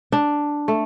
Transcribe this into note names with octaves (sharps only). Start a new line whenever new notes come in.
D4
A3